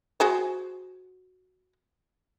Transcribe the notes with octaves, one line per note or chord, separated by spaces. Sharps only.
F#4 G#4 C5